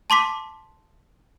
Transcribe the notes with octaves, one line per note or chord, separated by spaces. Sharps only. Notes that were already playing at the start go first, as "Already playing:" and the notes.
A5 C6 D6 B6